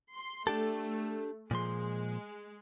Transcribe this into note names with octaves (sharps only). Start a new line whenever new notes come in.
C6
A3 D4 G4 A4
A#2 F3 G#3 C6